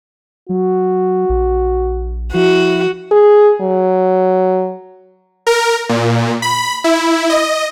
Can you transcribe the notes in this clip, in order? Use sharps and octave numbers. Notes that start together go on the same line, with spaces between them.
F#3 F#4
A#1
F3 E4 F#4
G#4
F#3
A#4
A#2
B5
E4
D#5